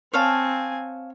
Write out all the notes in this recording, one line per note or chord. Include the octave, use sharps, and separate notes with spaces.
C4 C#5 F5 G#5 A5